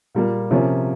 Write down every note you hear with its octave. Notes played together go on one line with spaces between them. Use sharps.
A#2 G3 A#3
C3 F3 A#3 C#4